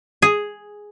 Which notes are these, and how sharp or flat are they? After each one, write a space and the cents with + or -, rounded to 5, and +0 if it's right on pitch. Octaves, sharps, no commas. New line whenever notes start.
G#4 +0